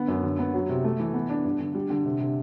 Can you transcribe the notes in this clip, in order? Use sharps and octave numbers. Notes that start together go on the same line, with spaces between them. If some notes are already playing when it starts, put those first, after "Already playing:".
Already playing: D3 B3
F#2
D3
B3
F#3
C3
A3
E3
B3
D4
G2
D3
G3
D3
C3
C3